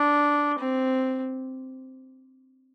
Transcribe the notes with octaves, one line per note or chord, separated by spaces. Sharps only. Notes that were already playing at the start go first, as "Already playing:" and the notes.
Already playing: D4
C4